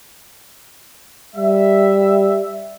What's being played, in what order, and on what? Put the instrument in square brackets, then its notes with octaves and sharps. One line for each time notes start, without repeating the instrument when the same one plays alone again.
[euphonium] G3 [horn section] E5